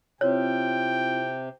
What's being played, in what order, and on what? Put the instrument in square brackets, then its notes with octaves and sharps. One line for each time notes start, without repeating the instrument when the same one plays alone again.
[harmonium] C3 [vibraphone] C4 E4 F4 [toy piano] C#5 [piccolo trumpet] G5